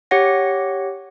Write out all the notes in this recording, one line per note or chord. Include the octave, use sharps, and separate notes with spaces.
G4 C#5 F#5 A#6